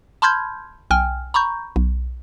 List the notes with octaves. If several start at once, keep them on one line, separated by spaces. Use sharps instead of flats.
A5 B5 C6 F6 G6 G#6
B1 G5 G#5 F6
A#5 B5 C#6 G6
B1